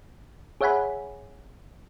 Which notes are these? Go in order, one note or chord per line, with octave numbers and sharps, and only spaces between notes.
G#4 C#5 E5 F#5 G#5 B5